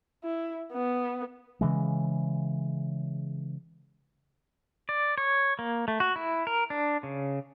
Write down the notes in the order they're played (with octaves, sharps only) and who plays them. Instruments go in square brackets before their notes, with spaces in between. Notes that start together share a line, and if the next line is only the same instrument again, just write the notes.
[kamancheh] E4
B3
[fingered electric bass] C#3 E3 G#3
[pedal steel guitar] D5
C#5
A#3
A3
F#4
E4
A#4
D4
C#3